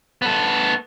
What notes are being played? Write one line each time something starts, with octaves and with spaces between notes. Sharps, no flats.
B3 A4